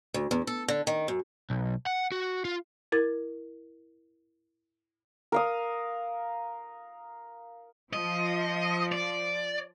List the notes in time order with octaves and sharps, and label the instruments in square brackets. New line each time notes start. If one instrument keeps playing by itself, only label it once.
[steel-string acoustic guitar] D2
E2
A4
D3
D#3
F#2
[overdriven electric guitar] B1
F#5
F#4
F4
[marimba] E4 A#4 A6
[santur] A#4 F5 D#6
[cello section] F3 [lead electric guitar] D#5
[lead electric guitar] D5